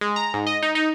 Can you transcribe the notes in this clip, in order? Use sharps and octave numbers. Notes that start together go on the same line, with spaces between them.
G#3
A#5
G#2
D#5
D#4
D#4